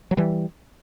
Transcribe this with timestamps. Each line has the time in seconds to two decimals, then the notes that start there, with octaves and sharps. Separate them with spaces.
0.11 F#3
0.17 E3 G3